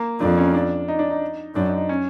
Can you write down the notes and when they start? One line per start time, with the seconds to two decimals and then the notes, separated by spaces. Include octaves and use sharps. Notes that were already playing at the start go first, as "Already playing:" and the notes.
Already playing: A#3
0.20 F2 D4
0.37 C#4
0.54 D4
0.88 D#4
0.99 D4
1.10 D#4
1.55 F#2 D4
1.67 D#4
1.78 D#4
1.89 C#4